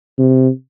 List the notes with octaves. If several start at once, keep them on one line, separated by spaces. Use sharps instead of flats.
C3